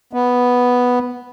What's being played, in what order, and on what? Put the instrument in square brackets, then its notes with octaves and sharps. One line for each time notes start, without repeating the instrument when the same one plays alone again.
[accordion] B3